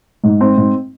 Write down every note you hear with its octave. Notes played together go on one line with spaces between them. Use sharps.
G#2
C4
G#2